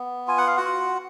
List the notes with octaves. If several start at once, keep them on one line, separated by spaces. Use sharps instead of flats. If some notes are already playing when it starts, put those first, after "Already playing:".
Already playing: B3
F4 G#5
F#5
F5
F#4 F#5
F4